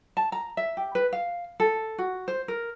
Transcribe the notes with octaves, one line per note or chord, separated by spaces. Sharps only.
A5
A#5
E5
G4
B4
F5
A4
F#4
C5
A#4